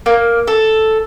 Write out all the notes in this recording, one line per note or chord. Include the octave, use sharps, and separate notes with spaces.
A#3
A4